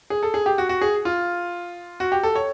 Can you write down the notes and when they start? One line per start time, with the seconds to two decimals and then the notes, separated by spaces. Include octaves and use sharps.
0.10 G#4
0.23 A4
0.34 G#4
0.46 G4
0.58 F#4
0.69 F#4
0.81 G#4
1.05 F4
2.00 F#4
2.12 G4
2.23 A4
2.36 C#5